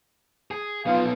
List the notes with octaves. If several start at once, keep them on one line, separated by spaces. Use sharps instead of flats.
G#4
B3 D#4 F4 F5